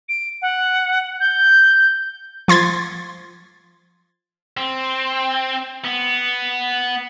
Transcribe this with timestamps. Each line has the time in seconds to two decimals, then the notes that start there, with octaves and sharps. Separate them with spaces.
0.09 D7
0.42 F#5
1.20 G6
2.48 F3 C6 G#6 A6
4.57 C4
5.84 B3